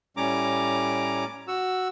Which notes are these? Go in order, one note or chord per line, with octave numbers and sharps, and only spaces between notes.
A2 G3 C#4 A#5 D6
F#4 E6